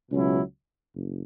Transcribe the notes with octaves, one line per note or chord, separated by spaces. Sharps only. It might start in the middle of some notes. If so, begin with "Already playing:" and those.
C#2 B2 F#3 C#4 E4
F#1